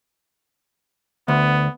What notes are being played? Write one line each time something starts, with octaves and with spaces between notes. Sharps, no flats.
D2 B3